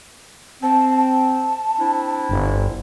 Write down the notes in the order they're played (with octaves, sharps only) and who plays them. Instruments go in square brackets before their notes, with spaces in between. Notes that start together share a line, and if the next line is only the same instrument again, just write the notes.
[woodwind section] C4 [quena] A5
[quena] A5
[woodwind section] C4 D4 E4
[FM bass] G1